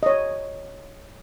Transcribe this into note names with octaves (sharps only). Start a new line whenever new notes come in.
C#5 D#5